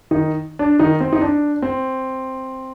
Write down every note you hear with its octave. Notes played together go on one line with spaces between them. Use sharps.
D#3 D#4
D4
D#3 D#4
C4
D#4
D4
C4